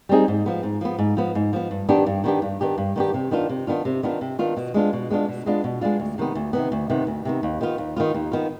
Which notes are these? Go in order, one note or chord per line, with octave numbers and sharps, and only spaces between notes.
G3 C4 D#4 G#4
G#2
F3 B3
G#2
F3 B3
G#2
F3 B3
G#2
F3 B3
G2
D#3 B3 D4 G4
G2
D#3 B3 D4 G4
G2
D#3 B3 D4 G4
G2
D#3 B3 D4 G4
C3
D#3 B3 D4 F4
C3
D#3 B3 D4 F4
C3
D#3 B3 D4 F4
C3
D#3 B3 D4 F4
B2
G#3 B3 D4 F4
B2
G#3 B3 D4 F4
B2
G#3 B3 D4 F4
B2
G#3 B3 D4 F4
D2
C3 D#3 B3
D2
C3 D#3 B3
D2
C3 D#3 B3
D2
C3 D#3 B3
D#2
D#3 B3 F4
D#2
D#3 B3 F4
D#2
D#3 B3 F4